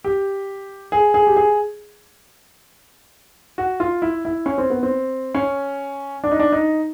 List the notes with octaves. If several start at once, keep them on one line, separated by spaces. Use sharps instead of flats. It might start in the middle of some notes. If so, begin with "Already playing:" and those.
G4
G#4
G#4
G4
G#4
F#4
F4
E4
E4
C#4
C4
B3
C4
C#4
D4
D#4
D4
D#4